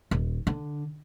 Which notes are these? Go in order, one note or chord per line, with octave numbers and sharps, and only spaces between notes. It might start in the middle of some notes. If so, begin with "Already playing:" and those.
D#1
D3